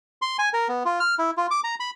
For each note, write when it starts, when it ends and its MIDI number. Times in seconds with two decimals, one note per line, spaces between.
0.22 0.37 84
0.39 0.49 80
0.53 0.68 70
0.69 0.83 59
0.85 0.99 65
1.00 1.15 89
1.19 1.31 64
1.37 1.47 65
1.51 1.60 86
1.64 1.75 82
1.80 1.90 83